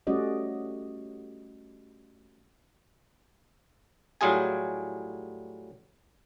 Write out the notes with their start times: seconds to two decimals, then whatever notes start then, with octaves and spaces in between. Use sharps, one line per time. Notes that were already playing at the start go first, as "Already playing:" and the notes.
0.07 G3 A3 C#4 F#4 D5 D#5
4.21 A2 F#3 G3 F4 G#4 G#5